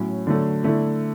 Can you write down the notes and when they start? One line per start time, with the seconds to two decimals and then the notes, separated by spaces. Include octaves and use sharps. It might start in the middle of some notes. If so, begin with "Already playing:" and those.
Already playing: A2 F#3 C#4
0.27 D3 F#3 A3
0.64 D3 A3 E4